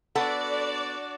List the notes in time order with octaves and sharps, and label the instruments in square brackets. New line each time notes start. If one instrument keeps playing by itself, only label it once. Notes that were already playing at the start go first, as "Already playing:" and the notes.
[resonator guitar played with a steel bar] B3 A4 F#5 [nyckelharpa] D4 F#4 [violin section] D5